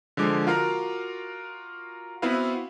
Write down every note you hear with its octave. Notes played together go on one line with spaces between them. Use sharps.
D3 F3 G#3 D6
F4 F#4 A#4 F5
B3 C4 E4 F#4 B4 F5